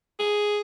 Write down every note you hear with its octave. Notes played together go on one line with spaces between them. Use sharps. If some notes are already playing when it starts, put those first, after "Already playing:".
G#4